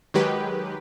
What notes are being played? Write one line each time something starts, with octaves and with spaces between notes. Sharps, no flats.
D#3 F#3 G#3 G4 B4